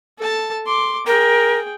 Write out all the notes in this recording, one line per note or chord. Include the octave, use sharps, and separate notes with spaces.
A4 A5
C6 D6
G#4 A#4 G5